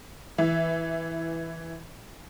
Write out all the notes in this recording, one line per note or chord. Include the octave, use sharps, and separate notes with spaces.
E3 E5